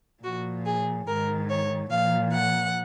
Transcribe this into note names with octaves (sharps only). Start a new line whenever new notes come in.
A#2 F3 F#4
G#4
G#2 D#3 A#4
C#5
A#2 F3 F5
F#5